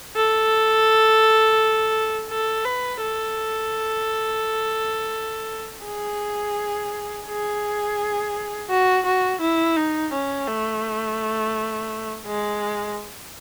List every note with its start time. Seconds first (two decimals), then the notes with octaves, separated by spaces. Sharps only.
0.16 A4
2.30 A4
2.64 B4
3.01 A4
5.86 G#4
7.28 G#4
8.70 F#4
9.06 F#4
9.41 E4
9.76 D#4
10.13 C#4
10.48 A3
12.26 G#3